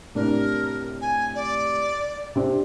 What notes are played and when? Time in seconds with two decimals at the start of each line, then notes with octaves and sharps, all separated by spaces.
0.15 A2 C3 D4 A#4
1.01 G#5
1.35 D5
2.36 C3 C4 D4